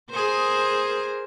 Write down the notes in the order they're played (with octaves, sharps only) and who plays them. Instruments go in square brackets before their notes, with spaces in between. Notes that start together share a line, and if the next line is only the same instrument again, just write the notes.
[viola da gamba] G#4 A#4 C5